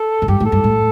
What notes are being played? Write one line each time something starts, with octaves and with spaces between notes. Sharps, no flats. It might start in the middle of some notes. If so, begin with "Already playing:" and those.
Already playing: A4
A2
G2 G4
A2
A4
G2
A2